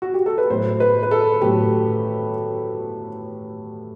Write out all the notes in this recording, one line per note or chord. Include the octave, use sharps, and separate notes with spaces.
F#4
G4
A4
B4
A2 F#3 A3 C5
B4
B4
A4
A2 F#3 A3 G4